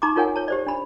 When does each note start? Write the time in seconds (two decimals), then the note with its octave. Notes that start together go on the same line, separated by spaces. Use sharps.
0.02 D#4 A#5 C#6 D6
0.16 D#4 F4 A#4 C#5 F#5 G#5
0.36 C#5 A5
0.48 G4 C5 D5
0.67 D4 B5